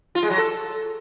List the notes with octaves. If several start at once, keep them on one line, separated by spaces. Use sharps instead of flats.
F4
G#3
F#3
A4